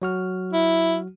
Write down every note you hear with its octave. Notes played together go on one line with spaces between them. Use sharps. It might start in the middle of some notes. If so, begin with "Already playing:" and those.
F#3 F#4 F6
E4